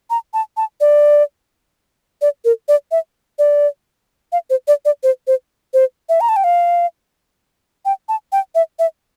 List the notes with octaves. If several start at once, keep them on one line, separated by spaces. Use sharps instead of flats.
A#5
A5
A5
D5
D5
A#4
D5
E5
D5
F5
C5
D5
D5
C5
C5
C5
E5
A#5
A5
G5
F5
G5
A5
G5
E5
E5